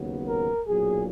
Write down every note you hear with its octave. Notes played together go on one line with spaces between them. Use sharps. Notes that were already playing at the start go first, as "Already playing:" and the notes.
Already playing: D#2 C#3 F#3 B3
A#4
B1 A#2 F#3 G#4